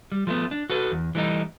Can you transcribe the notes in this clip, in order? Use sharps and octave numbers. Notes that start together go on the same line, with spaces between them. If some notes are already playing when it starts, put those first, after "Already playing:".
G3
F3 G#3 A3 B3
D4
F#4 A4 B4
E2
E3 G3 A3 D#4